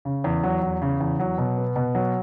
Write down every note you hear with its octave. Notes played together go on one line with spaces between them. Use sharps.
C#3
E2
F#3
E2
C#3
E2
F#3
B2
B3
B2
F#3